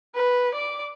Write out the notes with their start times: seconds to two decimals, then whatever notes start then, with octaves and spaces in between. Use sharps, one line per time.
0.15 B4
0.54 D5 D6